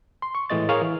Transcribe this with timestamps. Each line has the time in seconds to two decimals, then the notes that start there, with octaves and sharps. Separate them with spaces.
0.22 C6
0.35 C#6
0.50 A2 E3 G#3 D#5 A6
0.69 G#4 A#4 C#5 F5 C#6 D#6
0.82 E3